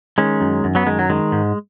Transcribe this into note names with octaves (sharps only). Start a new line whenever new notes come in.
D#3 G#3 C#4
F#2
F#2
F#3 B3
D#3 G#3
F#3
D#3 G#3
G#2